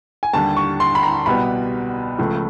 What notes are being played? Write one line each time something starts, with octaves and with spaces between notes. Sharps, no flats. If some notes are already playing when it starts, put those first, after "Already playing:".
G#5
D#2 D3 G3 A5
C#6
C6
B5
A#5
C2 B2 G3 B3 B5
C#2 C#3 F3 A3